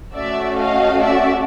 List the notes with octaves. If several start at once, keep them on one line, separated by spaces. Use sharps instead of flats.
A3 C#4 F#4 D5 E5
D#5 F5
D5 E5